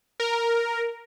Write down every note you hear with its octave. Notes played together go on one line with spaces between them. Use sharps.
A#4